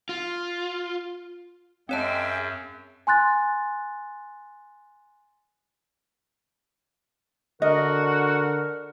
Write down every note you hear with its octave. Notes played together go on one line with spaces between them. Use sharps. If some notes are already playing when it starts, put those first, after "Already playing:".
F4
F#2 G#3 C4 C#5 E5 G5 A5
G#5 C6 F#6 A6
D3 F#4 A#4 D#5